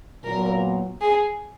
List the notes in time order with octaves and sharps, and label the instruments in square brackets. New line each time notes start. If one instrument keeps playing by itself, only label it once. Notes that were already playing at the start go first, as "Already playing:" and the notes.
[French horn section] A#2 F#3 B3 [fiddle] A#4
[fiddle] G#4